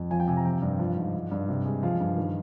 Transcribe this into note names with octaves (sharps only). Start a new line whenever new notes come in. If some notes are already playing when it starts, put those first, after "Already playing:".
Already playing: F2
F3 G#5
G5
C3 G#5
A#5
F3 G5
G2
F3
G#2
F3
G2
C3
G#3
F3 F5
G2
D#3